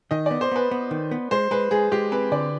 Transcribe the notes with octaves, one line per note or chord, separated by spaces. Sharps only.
D#3 D#5
B3 D5
C5
B3 B4
B3
D#3
B3
G#3 C5
G#3 B4
G#3 G#4
G#3 G4
C4 B4
D3 D5